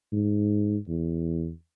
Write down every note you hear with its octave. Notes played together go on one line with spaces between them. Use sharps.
G#2
E2